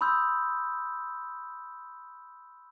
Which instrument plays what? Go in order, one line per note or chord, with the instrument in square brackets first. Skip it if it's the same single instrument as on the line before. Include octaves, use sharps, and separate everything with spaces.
[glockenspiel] B5 C6 D#6 E6 G6